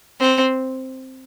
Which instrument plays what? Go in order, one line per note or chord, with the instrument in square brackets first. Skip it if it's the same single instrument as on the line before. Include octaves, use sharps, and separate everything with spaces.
[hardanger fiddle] C4